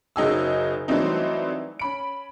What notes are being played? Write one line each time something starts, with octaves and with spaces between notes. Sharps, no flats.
F#1 F#3 D#4 G#4 E6
E3 F#3 G3 A3 C4 D#4
C#4 B5 D7